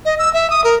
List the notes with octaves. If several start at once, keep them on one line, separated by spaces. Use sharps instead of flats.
D#5
E6
E5
D#6
A#4